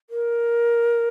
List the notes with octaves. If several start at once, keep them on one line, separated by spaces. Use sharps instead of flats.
A#4